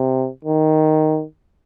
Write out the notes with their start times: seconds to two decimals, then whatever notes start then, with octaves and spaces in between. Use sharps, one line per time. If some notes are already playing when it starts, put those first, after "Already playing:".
Already playing: C3
0.45 D#3